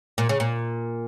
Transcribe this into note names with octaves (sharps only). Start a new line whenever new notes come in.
A#2
C#3
A#2